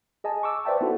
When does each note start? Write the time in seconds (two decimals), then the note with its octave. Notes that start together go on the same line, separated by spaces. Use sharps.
0.24 G#4 D#5 G#5 A5
0.43 C#6 D6 E6
0.65 B4 C5 D5 E5 G5 A5
0.81 B3 D#4 E4 F#4 A4